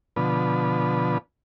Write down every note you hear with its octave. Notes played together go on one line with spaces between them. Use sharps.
B2 D3 F3 B4